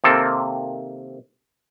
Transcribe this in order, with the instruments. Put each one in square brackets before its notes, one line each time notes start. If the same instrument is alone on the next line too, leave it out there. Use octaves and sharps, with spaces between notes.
[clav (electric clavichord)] C3 D#3 A#3 C4 A4